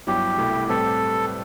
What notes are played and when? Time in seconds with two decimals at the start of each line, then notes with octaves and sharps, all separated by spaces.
0.07 G2 F#3 B3 E4 G4
0.38 C2 B2 A3 E4
0.69 A2 G3 C4 G4 A4 B4